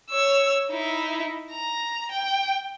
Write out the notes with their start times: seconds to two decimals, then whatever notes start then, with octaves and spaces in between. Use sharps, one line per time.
0.11 C#5 E6
0.70 D#4 E4
1.52 A#5
2.11 G5